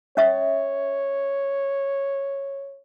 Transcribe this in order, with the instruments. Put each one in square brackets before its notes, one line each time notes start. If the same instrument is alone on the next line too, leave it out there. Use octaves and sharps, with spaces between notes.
[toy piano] C#4 E5 D#6 [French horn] C#5